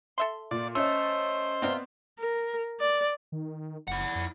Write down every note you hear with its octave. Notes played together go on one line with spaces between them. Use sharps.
A4 E5 C6
A#2 D5
A3 C#4 C5 D#5 E6
C3 B3 C4 F4 D5
A#4
D5
D#3
F#1 E4 F#5
F2